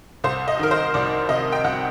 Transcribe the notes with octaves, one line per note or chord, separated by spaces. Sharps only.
C2 C5
D#5
D#3 A#4
C5
C2 D5
C3 D#5
G5
C2 F#5